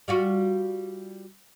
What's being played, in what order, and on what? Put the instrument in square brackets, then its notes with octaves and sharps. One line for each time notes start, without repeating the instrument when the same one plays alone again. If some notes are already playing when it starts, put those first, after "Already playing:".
[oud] G3 F4 F#4